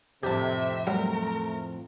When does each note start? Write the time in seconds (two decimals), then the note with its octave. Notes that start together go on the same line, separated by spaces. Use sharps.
0.23 F2 A2 C3 F3 G4 E5 A5
0.87 F#3 G3 A3 A#4